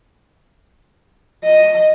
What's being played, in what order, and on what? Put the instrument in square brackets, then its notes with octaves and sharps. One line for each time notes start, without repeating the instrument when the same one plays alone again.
[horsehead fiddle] D#5